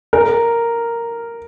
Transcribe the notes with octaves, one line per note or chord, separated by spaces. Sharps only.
A#4